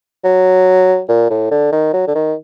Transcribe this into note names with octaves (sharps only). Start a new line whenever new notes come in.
F#3
A#2
A2
D3
D#3
F#3
D3
D#3